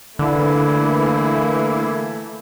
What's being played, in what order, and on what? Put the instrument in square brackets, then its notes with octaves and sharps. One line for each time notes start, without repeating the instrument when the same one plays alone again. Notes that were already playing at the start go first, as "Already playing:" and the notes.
[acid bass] D3 [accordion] E3 A#3 E4 [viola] A3